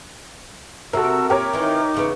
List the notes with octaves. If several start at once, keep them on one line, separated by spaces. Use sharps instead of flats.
C3 A#3 F#4 A4 A#4 E6
A#2 G4 A#4 C#5 D6
D#3 E3 D#4
E2 C#3 B3